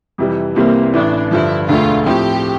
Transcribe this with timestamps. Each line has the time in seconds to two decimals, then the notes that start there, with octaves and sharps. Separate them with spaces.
0.18 F2 C3 E3 G3
0.56 C2 C3 E3 G3 A#3 C4
0.93 A1 A2 E3 D4
1.31 G2 D3 F3 E4
1.69 E1 D2 D3 A3 F4
2.06 A2 F3 C4 G4